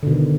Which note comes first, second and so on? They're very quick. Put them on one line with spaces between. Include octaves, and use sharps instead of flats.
D3 B2 D#3